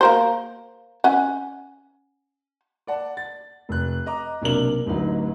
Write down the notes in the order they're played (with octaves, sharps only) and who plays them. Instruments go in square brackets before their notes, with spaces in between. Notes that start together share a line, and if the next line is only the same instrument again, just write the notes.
[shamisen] A#3 A#4 C5
C#4 F#5
[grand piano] D5 F#5 A5
A6
F1 F#6
D#5 A#5 D6
B1 C3 A#3 D4 A#4 F#7
D1 A1 D2 F#3 D#4